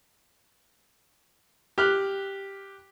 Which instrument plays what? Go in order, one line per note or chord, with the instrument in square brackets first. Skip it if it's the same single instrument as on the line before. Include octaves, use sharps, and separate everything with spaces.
[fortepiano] G4 F6 F#6